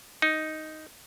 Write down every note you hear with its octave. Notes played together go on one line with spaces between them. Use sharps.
D#4